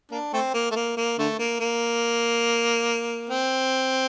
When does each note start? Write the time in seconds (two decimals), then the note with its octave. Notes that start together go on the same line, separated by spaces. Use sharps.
0.12 A#3 D4
0.33 A3 C4
0.54 A#3
0.72 A3
0.76 A#3
0.97 A#3
1.19 D3 A3
1.39 A#3
1.60 A#3
3.30 C4